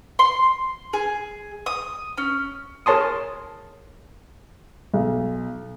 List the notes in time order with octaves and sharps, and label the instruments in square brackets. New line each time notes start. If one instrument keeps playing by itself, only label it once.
[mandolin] C6
G#4
D#6
C#4
[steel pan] G#4 A#4 C#5 A5 C6 D#6
[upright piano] B1